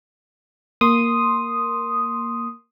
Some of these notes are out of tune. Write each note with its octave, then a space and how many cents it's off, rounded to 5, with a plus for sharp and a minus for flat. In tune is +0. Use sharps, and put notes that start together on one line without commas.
A#3 +0 C6 +0 D#6 +0